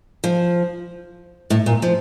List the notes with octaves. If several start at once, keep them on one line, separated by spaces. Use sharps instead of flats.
F3
A2
A#2
F3